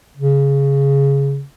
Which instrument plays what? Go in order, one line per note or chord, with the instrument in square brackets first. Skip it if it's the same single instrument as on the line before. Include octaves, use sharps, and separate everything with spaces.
[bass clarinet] C#3